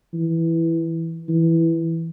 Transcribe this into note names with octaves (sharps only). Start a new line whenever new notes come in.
E3
E3